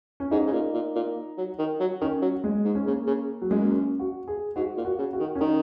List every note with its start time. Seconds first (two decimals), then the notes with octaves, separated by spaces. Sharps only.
0.20 C#4
0.31 G#2 D#4
0.47 C#3
0.53 A#2
0.74 A#2
0.96 A#2
1.38 F#3
1.59 D#3
1.80 F#3
2.02 D#3 C#4
2.22 F#3
2.44 G#3
2.65 G#2
2.75 C#4
2.86 C#3 A#3
3.07 C#3
3.42 F#3
3.50 F#2 G#3
3.62 A#3
3.72 C#4
3.99 F#4
4.28 G#4
4.56 G#2 F#4
4.77 A#2
4.85 F#4
4.99 C#3
5.13 F#4
5.20 D#3
5.36 C#4
5.40 D#3 D#4